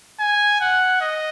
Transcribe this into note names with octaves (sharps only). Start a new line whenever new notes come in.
G#5
F#5
D#5